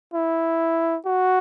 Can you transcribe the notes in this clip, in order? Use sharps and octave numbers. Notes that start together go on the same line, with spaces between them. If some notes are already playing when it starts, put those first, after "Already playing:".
E4
F#4